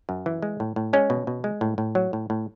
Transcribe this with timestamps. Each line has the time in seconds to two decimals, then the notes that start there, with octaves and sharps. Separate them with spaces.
0.09 F#2
0.26 E3
0.43 G#3
0.60 A2
0.76 A2
0.93 G#3 C#4
1.10 B2
1.27 B2
1.44 G#3
1.61 A2
1.78 A2
1.95 F#3
2.13 A2
2.30 A2